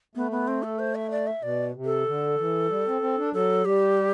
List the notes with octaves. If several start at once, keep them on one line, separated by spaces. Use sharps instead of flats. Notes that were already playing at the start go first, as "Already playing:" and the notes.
A3 B3
B3
C4
A4
C5
E5
D5
E5
B2 D5
C3
A4
D3
E3
G3
C4
C4
D4
F#3 A4
G3 G4